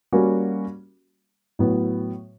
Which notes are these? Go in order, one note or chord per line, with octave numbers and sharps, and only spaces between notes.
G3 A#3 C#4 F#4
A2 F#3 B3